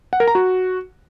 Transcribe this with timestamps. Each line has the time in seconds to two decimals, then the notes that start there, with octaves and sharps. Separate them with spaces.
0.13 F#5
0.20 A#4
0.28 A#5
0.35 F#4